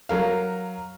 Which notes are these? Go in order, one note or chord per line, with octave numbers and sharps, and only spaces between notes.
F#3 A#4 F5